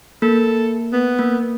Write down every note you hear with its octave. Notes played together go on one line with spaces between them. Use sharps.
A#3 A4
B3
A#3